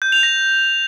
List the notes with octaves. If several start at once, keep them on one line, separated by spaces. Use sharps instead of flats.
G6
F7
A#6